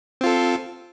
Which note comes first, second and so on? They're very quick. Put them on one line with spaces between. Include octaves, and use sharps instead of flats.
C4 F4 A4